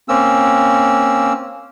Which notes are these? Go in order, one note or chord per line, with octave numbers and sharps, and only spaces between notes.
A#3 C4 C#4 E6